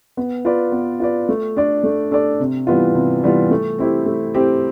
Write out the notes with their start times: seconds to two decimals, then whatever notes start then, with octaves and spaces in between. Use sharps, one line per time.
0.17 B3
0.45 F4 B4 D5
0.72 B3
1.00 F4 B4 D5
1.29 A3
1.57 D4 A4 D5
1.84 A3
2.11 D4 A4 D5
2.40 C3
2.67 E3 G3 B3 F4
2.95 C3
3.23 E3 G3 B3 F4
3.51 A3
3.79 C4 E4 G4
4.06 A3
4.34 C4 E4 G4